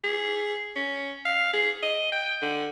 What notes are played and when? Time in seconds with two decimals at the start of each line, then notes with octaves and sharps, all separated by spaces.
0.04 G#4
0.76 C#4
1.25 F5
1.54 G#4
1.83 D#5
2.12 G5
2.42 D3